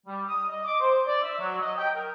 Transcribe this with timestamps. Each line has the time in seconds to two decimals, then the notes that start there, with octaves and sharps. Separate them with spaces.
0.07 G3
0.28 D#6
0.49 D#5
0.65 D6
0.80 C5
1.07 D5
1.22 E5
1.39 F#3
1.61 D#5
1.78 G5
1.95 A#4